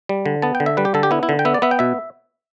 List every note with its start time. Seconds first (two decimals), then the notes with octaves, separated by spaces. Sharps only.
0.09 G3
0.26 D3
0.42 B3 A5
0.55 G5
0.60 D3
0.66 E5
0.77 G3 B4
0.85 G4
0.94 D3 A4
1.03 G4
1.11 B3 E4
1.23 E4
1.29 D3
1.39 G5
1.45 B3 E5
1.54 D5
1.62 B3 E5
1.71 G5
1.79 B2 E5